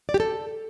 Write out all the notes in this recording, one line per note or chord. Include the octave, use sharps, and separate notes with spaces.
D5
G4
A4